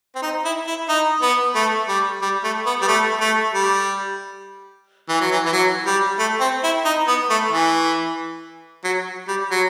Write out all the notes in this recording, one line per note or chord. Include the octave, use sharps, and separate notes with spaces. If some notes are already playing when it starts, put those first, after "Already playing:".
C4
D#4
E4
E4
D#4
B3
A3
G3
G3
A3
B3
G3
A3
A3
G3
E3
F#3
E3
E3
F#3
G3
A3
C4
E4
D#4
B3
A3
E3
F#3
G3
F#3